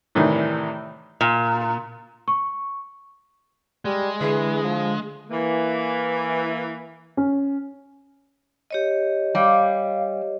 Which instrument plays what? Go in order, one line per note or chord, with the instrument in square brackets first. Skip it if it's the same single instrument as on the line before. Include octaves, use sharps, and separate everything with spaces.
[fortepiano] A2 C3 D#3 E3 G3
[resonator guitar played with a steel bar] A#2
[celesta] C#6
[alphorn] G3 [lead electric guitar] G#3
[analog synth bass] D3 [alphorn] E3 [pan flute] G#4
[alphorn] F3
[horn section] E3 A#3
[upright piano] C#4
[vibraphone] G4 C#5 D#5
[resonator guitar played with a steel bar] G3 [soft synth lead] F5